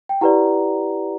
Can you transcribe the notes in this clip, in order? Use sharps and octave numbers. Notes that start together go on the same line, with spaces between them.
G5
E4 G4 B4 D5 F#5 A#5